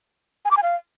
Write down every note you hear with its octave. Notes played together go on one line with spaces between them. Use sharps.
G#5
D6
G#5
F5